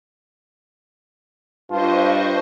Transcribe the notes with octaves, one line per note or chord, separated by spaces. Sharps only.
G2 F4 C5 D#5 A5 C#6